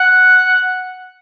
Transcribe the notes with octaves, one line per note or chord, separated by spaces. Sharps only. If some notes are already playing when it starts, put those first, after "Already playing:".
Already playing: F#5